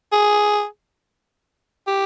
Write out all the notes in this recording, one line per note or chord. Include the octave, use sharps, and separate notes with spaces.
G#4
G4